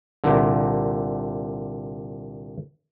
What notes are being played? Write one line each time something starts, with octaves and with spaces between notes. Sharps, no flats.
C2 A#2 D3